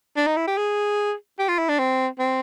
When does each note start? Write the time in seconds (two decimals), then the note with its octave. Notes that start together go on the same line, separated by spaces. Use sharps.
0.17 D4
0.27 D#4
0.37 E4
0.47 G4
0.57 G#4
1.39 G4
1.49 F4
1.59 E4
1.69 D4
1.79 C4
2.19 C4